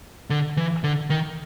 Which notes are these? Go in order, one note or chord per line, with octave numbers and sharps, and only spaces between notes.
D3
E3
D3
D#3